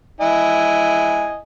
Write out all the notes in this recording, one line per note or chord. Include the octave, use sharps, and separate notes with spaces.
E4 D#5 G#5